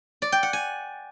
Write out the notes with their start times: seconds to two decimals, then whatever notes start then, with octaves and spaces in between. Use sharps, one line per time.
0.22 D5
0.32 G5
0.43 F#5
0.53 G#5